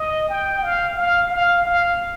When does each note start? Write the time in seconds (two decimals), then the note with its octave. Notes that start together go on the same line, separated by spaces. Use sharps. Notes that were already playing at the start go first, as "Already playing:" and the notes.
Already playing: D#5
0.29 G5
0.63 F5
0.97 F5
1.30 F5
1.66 F5